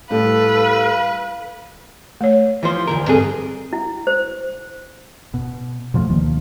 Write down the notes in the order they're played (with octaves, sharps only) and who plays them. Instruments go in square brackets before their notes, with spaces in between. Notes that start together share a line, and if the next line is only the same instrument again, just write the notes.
[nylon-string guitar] A2 G3 E4 [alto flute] A4 [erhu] B4 [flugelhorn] F5
[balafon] A3 C#5
[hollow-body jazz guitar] E3 F3 C5
D2 G2 A#4
[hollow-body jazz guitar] G2 G#4 [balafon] C4 A4
[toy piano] E4
C5
[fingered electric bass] B2
B2 F3 G3 A3
D2 D#3 F3 A#3